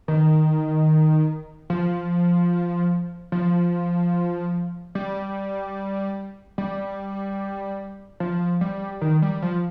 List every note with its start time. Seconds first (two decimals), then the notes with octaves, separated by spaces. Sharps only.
0.08 D#3
1.70 F3
3.32 F3
4.95 G3
6.58 G3
8.20 F3
8.61 G3
9.01 D#3
9.22 G3
9.42 F3